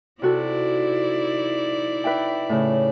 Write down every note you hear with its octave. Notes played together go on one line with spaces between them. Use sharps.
C3 D#4 E4 F#4 A4 D5
B4 E5 G5
A2 C#3